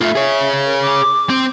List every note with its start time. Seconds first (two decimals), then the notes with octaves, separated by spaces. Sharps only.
0.01 A3 F4 E5
0.15 G#4 C#5
0.65 A#4
0.81 D6
1.30 C4